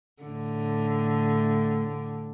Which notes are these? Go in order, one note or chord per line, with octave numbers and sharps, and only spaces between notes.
A2 D3